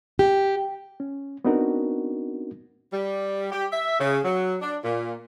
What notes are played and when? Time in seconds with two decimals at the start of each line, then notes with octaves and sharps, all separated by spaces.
0.19 G4
1.00 C#4
1.45 B3 C4 D4 D#4 F#4 A#4
2.92 G3
3.52 G4
3.72 E5
4.00 C#3
4.24 F#3
4.61 D4
4.84 A#2